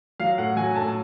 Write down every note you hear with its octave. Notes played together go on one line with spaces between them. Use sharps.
F#3 F5
A2 F#5
F#3 G#5
A2 A5